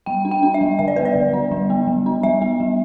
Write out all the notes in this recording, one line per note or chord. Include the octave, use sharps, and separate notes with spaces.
G3 G5
D4
G5
D4
E5
G3
D3 E5
D5
B3 B4
D5
D3
D4
G3
B3
G3
D4
G3 E5
B3
G3